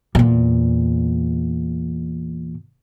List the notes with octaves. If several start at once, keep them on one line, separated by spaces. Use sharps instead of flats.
E2 A#2